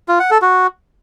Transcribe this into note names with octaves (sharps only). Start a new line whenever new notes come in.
F4
F#5
A4
F#4